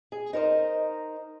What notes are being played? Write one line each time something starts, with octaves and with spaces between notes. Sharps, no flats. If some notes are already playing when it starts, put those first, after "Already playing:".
G#4
D#4 A#4 C5 D#5